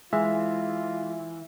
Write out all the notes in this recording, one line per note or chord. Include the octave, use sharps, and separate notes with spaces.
E3 G#3 F4 E5